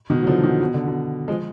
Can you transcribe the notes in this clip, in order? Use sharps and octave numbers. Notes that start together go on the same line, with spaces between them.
B2 D#3
F#3
D3 F3
B2 D#3
B2
D3
B2
F3 G#3